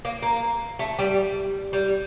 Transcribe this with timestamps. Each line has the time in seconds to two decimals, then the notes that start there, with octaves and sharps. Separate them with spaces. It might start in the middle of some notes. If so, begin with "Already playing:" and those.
0.05 A#3
0.22 A#3
0.79 A3
0.99 G3
1.73 G3